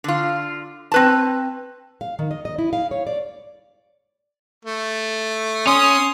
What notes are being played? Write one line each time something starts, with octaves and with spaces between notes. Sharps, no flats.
D3 F4
C4 B4 A5
F5
D#3
D#5
D#5
E4
F5
C#5
D5
A3
C#4 C6 D#6